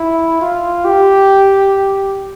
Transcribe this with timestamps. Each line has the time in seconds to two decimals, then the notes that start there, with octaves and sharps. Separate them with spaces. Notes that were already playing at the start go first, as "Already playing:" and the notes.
Already playing: E4
0.41 F4
0.85 G4